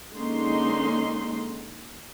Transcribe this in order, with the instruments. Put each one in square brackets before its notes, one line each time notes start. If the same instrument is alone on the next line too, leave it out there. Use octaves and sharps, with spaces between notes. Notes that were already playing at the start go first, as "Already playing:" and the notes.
[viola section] D3 G#3 A#3 C#4 D#4 C6